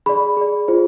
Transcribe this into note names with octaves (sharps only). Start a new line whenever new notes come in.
G#4 D5 B5
G#4 D5
F4 G#4 C5